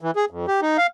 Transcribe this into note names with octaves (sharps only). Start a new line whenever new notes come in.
E3
G#4
F2
G4
D#4
F5